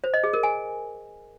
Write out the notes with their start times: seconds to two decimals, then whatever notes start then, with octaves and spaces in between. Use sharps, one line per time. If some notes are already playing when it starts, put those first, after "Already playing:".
0.04 C5
0.14 D#5
0.24 G#4
0.33 A#4
0.43 G#5